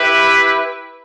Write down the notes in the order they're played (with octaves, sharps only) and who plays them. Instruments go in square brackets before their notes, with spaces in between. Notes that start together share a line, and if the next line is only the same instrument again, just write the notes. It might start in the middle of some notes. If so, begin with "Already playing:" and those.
Already playing: [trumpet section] E4 G4 B4 E5